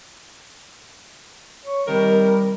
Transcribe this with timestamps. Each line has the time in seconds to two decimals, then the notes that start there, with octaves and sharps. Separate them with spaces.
1.65 C#5
1.87 C3 D#3 G3 A#4